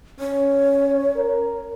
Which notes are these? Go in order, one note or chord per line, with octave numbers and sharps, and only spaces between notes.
C#4 C#5
A#4